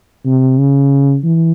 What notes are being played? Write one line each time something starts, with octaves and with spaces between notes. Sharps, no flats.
C3
C#3
E3